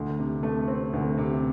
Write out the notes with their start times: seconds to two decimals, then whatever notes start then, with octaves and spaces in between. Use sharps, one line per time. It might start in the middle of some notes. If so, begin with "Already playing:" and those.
Already playing: D2
0.19 C3
0.43 A3
0.68 C4
0.93 D2
1.18 C3